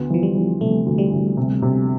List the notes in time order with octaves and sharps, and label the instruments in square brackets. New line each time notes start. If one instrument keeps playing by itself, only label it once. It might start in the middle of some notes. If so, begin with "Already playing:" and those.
Already playing: [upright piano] D2 [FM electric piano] B3
[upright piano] E3 [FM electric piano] F3
[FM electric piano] G3
[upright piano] E3
[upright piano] C3 [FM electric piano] A3
[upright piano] D2
[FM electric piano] G3
[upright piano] D2
C3
C3